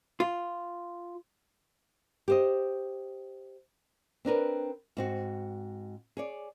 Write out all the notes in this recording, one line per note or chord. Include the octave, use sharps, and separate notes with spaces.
F4
G4 C5 D#5
C4 D4 A#4 B4
G#2 C4 F#4
G#4 C#5 D5